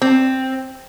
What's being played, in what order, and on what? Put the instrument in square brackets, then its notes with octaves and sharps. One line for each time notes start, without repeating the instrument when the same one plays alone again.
[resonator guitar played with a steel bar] C4